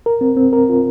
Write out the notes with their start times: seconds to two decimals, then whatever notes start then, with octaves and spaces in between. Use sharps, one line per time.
0.06 A#4
0.21 C4
0.37 C4
0.53 A#4
0.69 F4